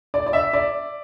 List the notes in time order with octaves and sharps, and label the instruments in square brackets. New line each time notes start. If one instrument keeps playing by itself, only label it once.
[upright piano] D5
D5
E5
D5